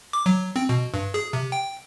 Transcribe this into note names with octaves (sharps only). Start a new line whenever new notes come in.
D6
F#3
C4
B2
G2
G#4
C3
G5